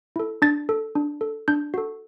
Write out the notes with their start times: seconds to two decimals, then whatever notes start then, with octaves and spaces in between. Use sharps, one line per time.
0.16 E4 A4
0.42 D4 A6
0.69 A4
0.95 D4
1.21 A4
1.48 D4 G6
1.74 F#4 A4